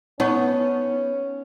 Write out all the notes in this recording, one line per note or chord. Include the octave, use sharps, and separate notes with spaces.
B3 C#4 D#4 C#5 C#6